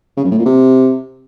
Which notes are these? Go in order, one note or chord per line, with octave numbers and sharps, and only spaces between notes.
C#3
F#2
A2
A#2
C3